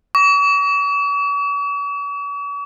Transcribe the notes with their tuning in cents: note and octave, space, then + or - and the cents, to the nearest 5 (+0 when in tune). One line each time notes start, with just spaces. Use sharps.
C#6 +45